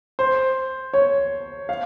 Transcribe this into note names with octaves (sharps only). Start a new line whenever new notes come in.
C5
C#5
F5